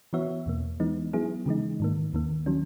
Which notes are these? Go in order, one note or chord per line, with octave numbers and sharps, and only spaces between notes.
E3 B3 F#4 C#5 E5
E2 B2 A#3
E3 G#3 B3 D#4
F#3 B3 E4 G#4
C#3 E3 G#3 D#4
G#2 D#3 A#3
D#2 D#3 A#3
D#3 F#3 C#4